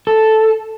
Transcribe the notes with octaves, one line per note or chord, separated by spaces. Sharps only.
A4